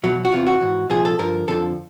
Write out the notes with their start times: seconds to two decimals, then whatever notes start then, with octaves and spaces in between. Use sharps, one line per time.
0.03 E2 B2 F#3
0.25 F#4
0.32 E2 C3 E3 F4
0.47 F#4
0.61 G#2 E3
0.90 C2 A#2 F3 G#4
1.05 A4
1.19 G2 D3 F3 A#4
1.48 F2 D3 F3 A4